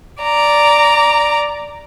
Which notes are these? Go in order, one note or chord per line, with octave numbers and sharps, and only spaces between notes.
D5 A#5